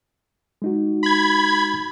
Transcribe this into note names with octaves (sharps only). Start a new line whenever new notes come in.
G#3 D#4 F#4
B5 G#6